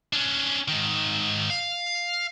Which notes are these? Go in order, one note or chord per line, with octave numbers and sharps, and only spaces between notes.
C#4 D4
G#2 D#3
F5